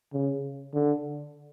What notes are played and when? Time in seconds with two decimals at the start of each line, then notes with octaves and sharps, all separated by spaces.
0.13 C#3
0.74 D3